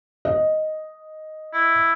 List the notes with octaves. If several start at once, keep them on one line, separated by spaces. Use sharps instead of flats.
D#5
E4